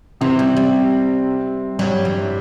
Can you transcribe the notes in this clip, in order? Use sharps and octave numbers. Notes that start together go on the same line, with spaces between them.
C3 E3 C4
G3
G3
G2 F#3 G3
E3